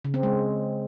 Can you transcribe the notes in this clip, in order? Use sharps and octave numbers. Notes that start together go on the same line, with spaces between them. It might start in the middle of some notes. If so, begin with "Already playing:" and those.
C#3
C4
G#3